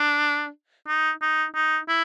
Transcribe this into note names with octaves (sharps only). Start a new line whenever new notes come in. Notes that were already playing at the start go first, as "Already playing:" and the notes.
Already playing: D4
D#4
D#4
D#4
E4